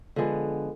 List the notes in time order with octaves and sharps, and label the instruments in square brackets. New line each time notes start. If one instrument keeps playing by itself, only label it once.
[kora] D3 F3 G#3 B3